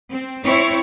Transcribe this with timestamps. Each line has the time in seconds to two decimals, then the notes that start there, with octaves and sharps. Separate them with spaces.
0.11 C4
0.44 C4 E4 C#5